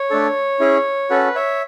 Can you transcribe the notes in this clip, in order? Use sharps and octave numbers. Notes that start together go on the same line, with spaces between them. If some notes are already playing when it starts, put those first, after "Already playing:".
Already playing: C#5
A3 D4 A4
C#4 E4 G#4
C#4 F#4 A4 B4
C#5 E5